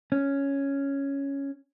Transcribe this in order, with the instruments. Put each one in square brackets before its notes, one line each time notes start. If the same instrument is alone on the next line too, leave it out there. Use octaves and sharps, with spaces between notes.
[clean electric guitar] C#4